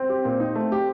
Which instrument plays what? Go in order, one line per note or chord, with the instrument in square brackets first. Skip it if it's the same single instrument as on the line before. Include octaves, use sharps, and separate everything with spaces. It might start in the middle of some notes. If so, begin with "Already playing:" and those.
Already playing: [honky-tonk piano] C4
[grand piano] G4
A#2
D#4
A3
G4